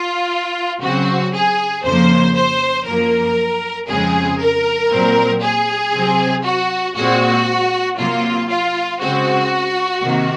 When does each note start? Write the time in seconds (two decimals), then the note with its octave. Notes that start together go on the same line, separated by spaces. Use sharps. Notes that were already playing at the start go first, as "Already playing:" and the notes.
Already playing: F4
0.82 C#3 F#3 C4 F#4
1.34 G#4
1.84 F2 C#3 F3 A#3 C5
2.36 C5
2.86 F#2 F3 A#3 A#4
3.89 F2 C#3 G#3 C4 G#4
4.40 A#4
4.91 A#2 F#3 C4
5.42 G#4
5.94 C3 F#3 C4
6.44 F#4
6.96 A#2 G#3 C4 F#4
7.98 C3 F#3 A#3 F4
8.50 F4
9.00 C#3 G#3 C4 F#4
10.03 C3 D#3 A#3